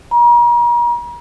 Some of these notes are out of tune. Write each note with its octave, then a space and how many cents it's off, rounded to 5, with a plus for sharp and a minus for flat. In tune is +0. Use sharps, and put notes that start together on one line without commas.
A#5 +40